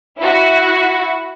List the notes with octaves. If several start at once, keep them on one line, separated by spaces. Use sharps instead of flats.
E4 F#4